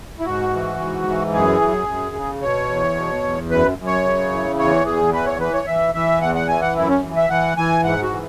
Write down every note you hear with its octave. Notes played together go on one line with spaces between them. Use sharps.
E4
G#2 F#4
E3
G#2
E3
F#2 G#4
F#2
F#2
C#3
B2 C#5
E2
B2
E2
F#2 B4
F#2
C#5
C#3
E3
E2 C#5
E2 G#4
E3 B4
C#5
E3 B4
C#5
E3 E5
E3 E5
E2 F#5
F#5
E3 G#5
F#5
F#2 E4
C#4
E3
E5
E3 F#5
E3 G#5
G#2 F#5
F#4
E3